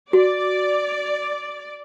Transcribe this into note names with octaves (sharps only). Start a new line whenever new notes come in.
F#4 D5